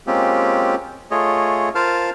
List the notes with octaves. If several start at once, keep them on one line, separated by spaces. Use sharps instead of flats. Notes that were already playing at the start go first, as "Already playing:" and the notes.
G#3 A#3 C4 C#4 F4 G4
A3 F4 G#4 C#5 D#5
F4 A#4 C5 F5 A5 F6